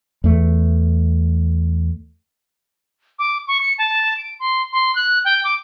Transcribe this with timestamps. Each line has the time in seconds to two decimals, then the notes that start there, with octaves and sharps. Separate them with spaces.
0.24 E2 A3
3.19 D6
3.48 C#6
3.61 C#7
3.78 A5
4.18 D7
4.40 C6
4.73 C6
4.95 F#6
5.25 G5
5.44 D6